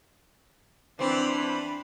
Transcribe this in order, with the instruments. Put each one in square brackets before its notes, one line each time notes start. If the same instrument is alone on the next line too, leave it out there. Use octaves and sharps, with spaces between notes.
[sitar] E3 C4 [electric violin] D4 B5